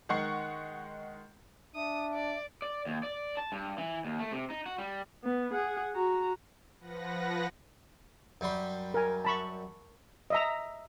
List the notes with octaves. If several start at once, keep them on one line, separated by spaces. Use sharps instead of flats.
D#3 G#3 F#5 C#6 C7
D4 E5 D#6
D5
D5
D#2
D5
A5
G2
E3
D#2
A3
C3
D#4
F#4
G3
B3
G#4 F#5
F#4 A#5
F3 B4 F#5 A#6
F#2 G3 C6
A#4 G#5
A5 B5 C#6
D#5 E5 A#5